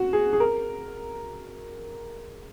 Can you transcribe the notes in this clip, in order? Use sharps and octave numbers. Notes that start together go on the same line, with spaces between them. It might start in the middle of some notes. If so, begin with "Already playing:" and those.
Already playing: F#4
G#4
G#4
A#4